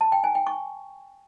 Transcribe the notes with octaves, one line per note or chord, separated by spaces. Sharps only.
A5
G5
G#5
G5
C#6